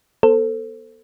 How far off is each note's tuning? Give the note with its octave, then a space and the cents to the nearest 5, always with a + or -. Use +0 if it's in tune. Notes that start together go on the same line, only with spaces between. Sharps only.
B3 -30 A4 +20 C5 +0